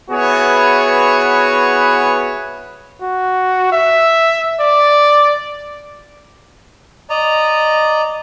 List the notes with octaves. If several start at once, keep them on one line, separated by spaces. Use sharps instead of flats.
B3 E4 F#4 G#4 B4 C#5
F#4
E5
D5
D5 D#5 A#5